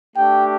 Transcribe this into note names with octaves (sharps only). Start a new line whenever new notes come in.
A3 D4 G4 G5